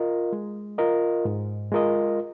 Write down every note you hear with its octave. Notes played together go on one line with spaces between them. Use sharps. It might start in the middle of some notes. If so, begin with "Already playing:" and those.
Already playing: F4 A#4 D#5
G#3
F4 A#4 D#5
G#2
G#3 F4 A#4 D#5